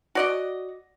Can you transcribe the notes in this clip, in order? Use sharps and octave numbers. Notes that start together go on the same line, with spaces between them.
F#4 D5 D#5